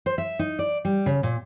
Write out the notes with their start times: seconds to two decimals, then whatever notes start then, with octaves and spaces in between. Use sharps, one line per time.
0.06 C5
0.18 E5
0.39 D#4
0.59 D5
0.85 G3
1.06 C#3
1.23 A#2